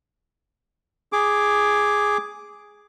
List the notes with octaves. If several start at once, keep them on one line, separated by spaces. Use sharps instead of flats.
G#4 D6